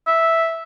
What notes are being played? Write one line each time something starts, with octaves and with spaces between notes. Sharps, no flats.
E5